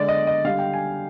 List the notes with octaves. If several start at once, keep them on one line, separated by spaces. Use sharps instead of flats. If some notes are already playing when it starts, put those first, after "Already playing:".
Already playing: D3 G#3 D5
D#5
D#5
D3 G3 F5
G5
G#5